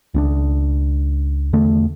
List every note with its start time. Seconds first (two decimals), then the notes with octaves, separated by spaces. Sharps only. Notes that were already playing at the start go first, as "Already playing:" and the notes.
0.14 C#2 C4 D4
1.53 E2 D3 A3